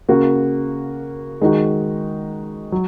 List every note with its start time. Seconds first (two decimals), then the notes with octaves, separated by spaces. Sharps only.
0.09 C#3 A#3 F#4
1.41 D#3 G#3 D#4 F#4
2.72 F#3